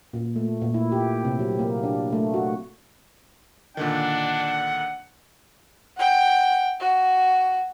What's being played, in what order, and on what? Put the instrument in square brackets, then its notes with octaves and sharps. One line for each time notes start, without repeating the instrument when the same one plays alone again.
[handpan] A#2
A3
A#2
E4
G4
C3
F#3
A#3
D4
A3
F#4
[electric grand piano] A#2 D3 D#3 [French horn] D4 [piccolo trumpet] F#5
[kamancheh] F#5 G5
F#4